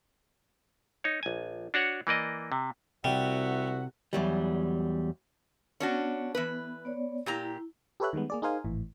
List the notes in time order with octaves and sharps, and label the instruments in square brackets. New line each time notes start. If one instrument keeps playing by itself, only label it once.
[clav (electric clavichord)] D#4 C#5
A#1 G#5
D4 F#4 C#5 F#5
E3 A#3 D5 D#5
C3
[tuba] C2 [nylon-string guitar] C3 [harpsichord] G3 [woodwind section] F#4 E5 F#5
[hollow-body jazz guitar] E2 F#3 G3
[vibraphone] B3 [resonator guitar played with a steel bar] C#4 D4 F#4
[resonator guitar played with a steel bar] E3 B4
[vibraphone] B3 C#5 D5
[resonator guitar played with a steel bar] A#2 G4 A#5 [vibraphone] E4
[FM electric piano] G4 A4 B4 C#5 E5 F#6
D#3 G3 G#3 B3
A#3 G#4 D5
D#4 G#4 A#4 C5 F5 G#5
G#1 A2 E3